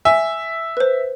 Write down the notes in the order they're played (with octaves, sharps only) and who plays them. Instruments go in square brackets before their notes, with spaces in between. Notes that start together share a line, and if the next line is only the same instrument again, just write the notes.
[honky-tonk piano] E5 [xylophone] G#5
[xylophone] B4 C5